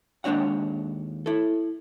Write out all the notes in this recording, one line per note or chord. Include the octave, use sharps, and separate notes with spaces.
D#2 G#3 D4 C#5 F#5
E4 A4